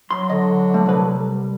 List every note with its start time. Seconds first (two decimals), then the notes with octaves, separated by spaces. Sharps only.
0.11 F#3 C6
0.30 D3 D#5
0.74 A3
0.86 C2 B4
1.08 G3